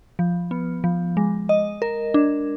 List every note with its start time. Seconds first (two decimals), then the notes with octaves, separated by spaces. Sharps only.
0.19 F3
0.51 B3
0.84 F3
1.17 G#3
1.49 D#5
1.82 A#4
2.14 D4